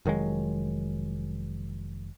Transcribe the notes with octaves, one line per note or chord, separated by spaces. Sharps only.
F1 D#3 F#3 G#3